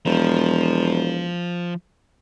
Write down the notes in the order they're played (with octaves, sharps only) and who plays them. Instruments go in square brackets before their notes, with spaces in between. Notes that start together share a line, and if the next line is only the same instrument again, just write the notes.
[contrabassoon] E1 [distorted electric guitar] F3